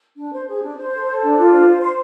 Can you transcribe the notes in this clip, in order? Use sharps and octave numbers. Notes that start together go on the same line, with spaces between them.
D4
C5
G#4
D4
C5
A4
A4
D4
F4
C5
C5
C5 C6